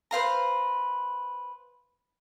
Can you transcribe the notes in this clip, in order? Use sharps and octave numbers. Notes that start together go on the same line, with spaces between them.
B4 C5 F5 A#5